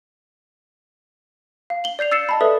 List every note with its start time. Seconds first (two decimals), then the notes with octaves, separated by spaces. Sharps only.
1.70 F5
1.84 F#7 G7
1.99 D5 G6 C7 F7
2.11 E6 A6 C7 C#7 E7
2.29 D#5 A5 B5
2.41 A4 B4 D5 E5 D#6